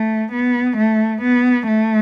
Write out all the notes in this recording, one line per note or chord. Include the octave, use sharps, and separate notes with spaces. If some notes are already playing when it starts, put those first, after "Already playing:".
Already playing: A3
B3
A3
B3
A3